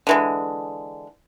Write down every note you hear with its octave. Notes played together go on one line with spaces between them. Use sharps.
D3 E3 G#3